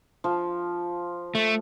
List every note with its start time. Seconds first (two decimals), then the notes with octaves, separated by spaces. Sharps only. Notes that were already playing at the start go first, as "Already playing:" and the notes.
0.24 F3
1.35 A3